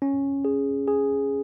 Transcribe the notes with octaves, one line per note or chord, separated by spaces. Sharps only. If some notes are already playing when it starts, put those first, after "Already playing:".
C#4
G#4
G#4